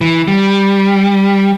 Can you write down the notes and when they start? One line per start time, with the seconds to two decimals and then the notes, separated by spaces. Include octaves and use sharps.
0.01 E3
0.28 G3